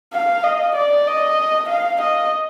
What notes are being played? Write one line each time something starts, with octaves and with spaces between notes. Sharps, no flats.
F5
D#5
D5
D#5
F5
D#5